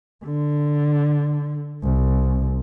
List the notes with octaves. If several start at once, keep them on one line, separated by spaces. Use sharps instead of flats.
D3
C2